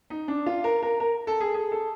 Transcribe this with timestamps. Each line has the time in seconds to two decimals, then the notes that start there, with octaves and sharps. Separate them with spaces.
0.10 D#4
0.28 D4
0.46 F4
0.64 A#4
0.83 A#4
1.00 A#4
1.27 A4
1.40 G#4
1.54 G#4
1.72 A4